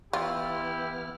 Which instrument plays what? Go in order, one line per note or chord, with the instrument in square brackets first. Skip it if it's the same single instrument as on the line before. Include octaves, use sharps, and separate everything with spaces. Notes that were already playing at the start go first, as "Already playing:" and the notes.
[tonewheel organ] E3 B3 F6 [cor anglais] E4 [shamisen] F4 [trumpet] G4